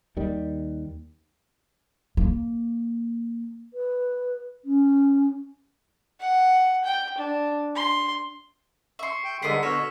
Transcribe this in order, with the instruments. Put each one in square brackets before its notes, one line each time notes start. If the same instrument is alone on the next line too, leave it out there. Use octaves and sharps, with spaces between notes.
[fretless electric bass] D#2 D#3 G3
[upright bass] A#3
[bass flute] B4
C#4
[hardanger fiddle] F#5
G5
D4
C6
[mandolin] E5 C6 [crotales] C#6 C#7
[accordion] G5
[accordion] G2 D3 G#3 [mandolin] B3 A#4 C6 [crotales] E6 B6
[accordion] B2 D3 [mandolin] C#5 [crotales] F6 A#6 E7